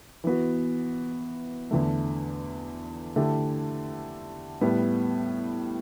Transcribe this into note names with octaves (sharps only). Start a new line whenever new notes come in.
E3 B3 F#4
E2 D3 A3
D3 A3 E4 G4
A2 G3 B3